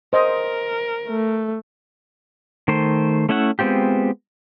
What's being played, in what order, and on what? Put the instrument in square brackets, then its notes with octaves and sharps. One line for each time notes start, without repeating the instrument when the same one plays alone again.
[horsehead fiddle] A#4 [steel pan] C5 D#5
[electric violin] A3
[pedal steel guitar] D#3 A3 C5
A3 C#4 E4 E5 F#5
G#3 B3 C4 F4 G4